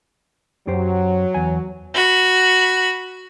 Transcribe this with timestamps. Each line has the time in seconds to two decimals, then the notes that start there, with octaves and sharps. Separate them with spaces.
0.67 F#2 F#3 G4 C5
1.34 E2 G#5
1.94 F#4 B5